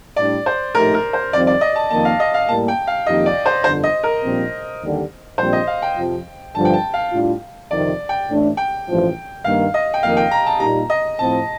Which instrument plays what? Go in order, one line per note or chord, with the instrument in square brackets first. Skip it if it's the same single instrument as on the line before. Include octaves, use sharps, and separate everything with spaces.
[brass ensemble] A2 G3 D4 [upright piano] D5
[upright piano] C5
[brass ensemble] A#1 A2 A3 D#4 G4 [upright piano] A#4
[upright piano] A#4
C5
[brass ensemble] F2 D#3 G3 C4 F4 [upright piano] D5
[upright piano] D5
D#5
A5
[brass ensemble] F2 D#3 A#3 [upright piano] A5
[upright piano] F5
D#5
F5
[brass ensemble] A2 G3 A#3 [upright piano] A5
[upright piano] G5
F5
[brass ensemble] F2 D#3 A#3 D#4 G4 [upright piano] D#5
[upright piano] D5
C5
[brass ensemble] G1 F2 D3 [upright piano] C5
[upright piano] D#5
A#4
[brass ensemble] A#1 A#2 G3 C4
D#2 D3 G3
[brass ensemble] A#1 A#2 G3 C4 [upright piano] C5
[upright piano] D#5
F5
G5
[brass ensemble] F2 C3 F3
[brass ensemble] G2 D3 F3 [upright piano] A5
[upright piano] G5
A5
F5
[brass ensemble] A2 G3 D4 F4
[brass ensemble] F2 C3 D#3 [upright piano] D5
[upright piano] G5
[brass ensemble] A1 A2 A3 D4
[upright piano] G5
[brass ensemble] A1 G2 F3 A3
[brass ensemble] G2 D#3 A#3 [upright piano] F5
[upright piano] D#5
G5
[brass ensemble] F2 D#3 A#3 [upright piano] F5
[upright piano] G5
A#5
A5
[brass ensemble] A#2 G3 A#3 D#4 G4 [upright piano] A#5
[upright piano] D#5
[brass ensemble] A2 F3 C4 [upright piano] A5